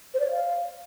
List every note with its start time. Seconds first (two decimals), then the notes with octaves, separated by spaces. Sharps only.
0.14 C5
0.20 D5
0.26 C#5
0.31 F5